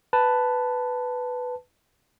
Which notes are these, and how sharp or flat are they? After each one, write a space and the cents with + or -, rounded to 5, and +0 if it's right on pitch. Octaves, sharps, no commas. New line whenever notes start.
B4 +5 A5 +0